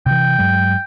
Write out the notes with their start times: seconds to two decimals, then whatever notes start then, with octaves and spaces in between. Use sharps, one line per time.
0.06 C3 E3 G5
0.38 G2 F#3 G#3